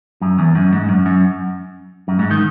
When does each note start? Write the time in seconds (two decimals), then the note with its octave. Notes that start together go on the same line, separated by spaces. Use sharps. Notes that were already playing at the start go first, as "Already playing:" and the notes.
0.21 F#2
0.39 E2
0.55 F#2
0.73 G#2
0.89 F#2
1.06 F#2
2.08 F#2
2.19 G#2
2.31 D#3